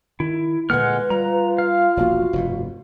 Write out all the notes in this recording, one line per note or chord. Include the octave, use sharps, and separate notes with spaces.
D#3 E4
A#2 D3 G#3 A#3 B4 F#5 F6
G3 F4 A#5
F5
E1 A#1 A#3 F#4
F1 G2 B2